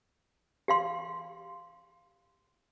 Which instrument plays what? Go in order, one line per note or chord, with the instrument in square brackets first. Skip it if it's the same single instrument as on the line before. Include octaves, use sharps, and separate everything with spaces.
[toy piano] G4 F5 C6